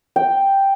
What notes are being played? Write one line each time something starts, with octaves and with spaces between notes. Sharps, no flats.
G5